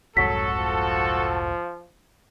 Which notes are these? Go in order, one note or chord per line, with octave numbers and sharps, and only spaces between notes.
F1 C2 G#2 F#3 F#4 A4 B6
F3